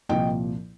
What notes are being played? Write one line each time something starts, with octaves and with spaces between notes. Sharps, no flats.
C2 A#2 F3 A#3 D#5 G5